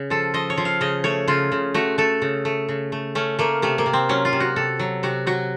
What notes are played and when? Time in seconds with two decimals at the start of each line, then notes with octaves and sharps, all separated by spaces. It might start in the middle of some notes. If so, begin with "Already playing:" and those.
Already playing: C#3
0.10 F3 A4
0.34 F3 D#5
0.50 C#5
0.58 F3
0.65 F5
0.81 C#3 D#5
1.04 A3 C#5
1.28 C#3 F4
1.52 C#3
1.74 A3 F#4
1.98 A3 A4
2.22 C#3
2.45 A3
2.69 C#3
2.92 A3
3.15 A3 C#4
3.39 A3 A#3
3.62 C3 A3
3.78 A#3
3.86 C3
3.93 C4
4.09 F#3 C#4
4.25 F4
4.33 C3
4.40 F#4
4.56 C3 A4
4.79 F#3
5.03 C3 F#4
5.27 F#3 F#4